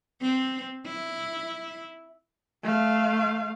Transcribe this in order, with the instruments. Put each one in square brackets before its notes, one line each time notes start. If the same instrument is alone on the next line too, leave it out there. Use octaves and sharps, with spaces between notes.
[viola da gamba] C4
E4
[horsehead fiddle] A3 F5